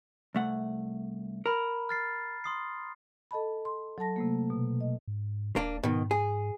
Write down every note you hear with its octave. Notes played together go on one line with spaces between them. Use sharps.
C2 A3 F#5
A#4 A#5 B5
F6 A6 C7
C6 D#6 C7
A4 D#5 A5 B5
C6
F#3 A4 A5 A#6
C3 A3 A#3
B2
D#5
G#2
D#1 A#3 D4
G#2 B2 D#3
G#4